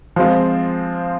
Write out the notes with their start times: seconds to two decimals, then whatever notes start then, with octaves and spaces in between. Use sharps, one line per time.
0.16 F3 G#3 C4 F4